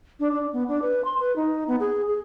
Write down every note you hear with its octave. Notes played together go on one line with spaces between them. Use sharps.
D4
D4
B3
D4
B4
C6
B4
D#4
B3
G#4
G#4